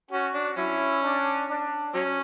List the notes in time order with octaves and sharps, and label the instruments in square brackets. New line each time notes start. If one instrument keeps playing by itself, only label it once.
[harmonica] C#4 [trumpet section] F#4
[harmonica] D4
[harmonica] F#3 C#4 [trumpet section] E4
[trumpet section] D4
D4
[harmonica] F#3 C#4